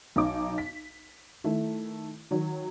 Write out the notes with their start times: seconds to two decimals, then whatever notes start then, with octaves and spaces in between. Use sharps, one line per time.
0.16 B1 D#4 D6
0.58 B6
1.44 D#3 A3 E4
2.31 D#3 F#3